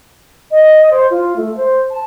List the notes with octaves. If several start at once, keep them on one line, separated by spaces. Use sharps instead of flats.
D#5
C5
F4
A3
C5
A5